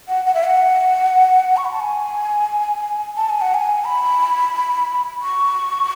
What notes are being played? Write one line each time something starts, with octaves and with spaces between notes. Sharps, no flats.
F#5
F#5
E5
F#5
C#6
B5
A5
G#5
A5
G#5
F#5
G#5
B5
C#6